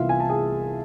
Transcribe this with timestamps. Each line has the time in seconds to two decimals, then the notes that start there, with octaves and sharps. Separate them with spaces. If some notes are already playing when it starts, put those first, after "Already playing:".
Already playing: C2 C3 E3 B3 F4 E5 F5
0.09 G#5
0.20 A5
0.29 G#4 G#5